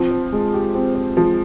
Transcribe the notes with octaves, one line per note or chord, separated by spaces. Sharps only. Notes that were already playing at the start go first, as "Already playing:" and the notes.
Already playing: F3 C4
C5
G#3
G4
C4
C5
F3 G#3